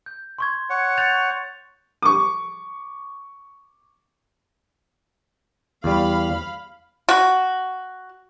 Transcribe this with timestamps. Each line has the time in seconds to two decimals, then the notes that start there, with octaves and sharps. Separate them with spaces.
0.06 G6
0.38 C6 C#6 G#6
0.70 C#5 F#5
0.97 G6 A6 F7
2.02 C#6 D6
5.84 E2 G3 F5 B5
7.09 F#4